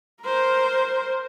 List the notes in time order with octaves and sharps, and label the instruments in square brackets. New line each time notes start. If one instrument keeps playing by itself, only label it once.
[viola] A#4 C5